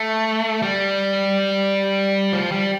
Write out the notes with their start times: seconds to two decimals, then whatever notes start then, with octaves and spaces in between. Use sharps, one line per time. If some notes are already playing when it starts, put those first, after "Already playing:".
Already playing: A3
0.62 G3
2.33 F3
2.52 G3